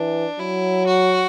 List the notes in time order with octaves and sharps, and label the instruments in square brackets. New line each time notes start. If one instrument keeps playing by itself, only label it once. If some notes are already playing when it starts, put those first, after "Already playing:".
Already playing: [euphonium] E3 [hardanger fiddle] D4
[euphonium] F#3 [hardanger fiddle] E4
[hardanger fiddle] F#4